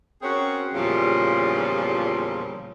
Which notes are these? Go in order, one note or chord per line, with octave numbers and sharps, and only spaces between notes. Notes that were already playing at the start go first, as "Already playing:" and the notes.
C4 C#4 F#4 G#4 A#4 C#5
E2 A#2 C#3 F3 G3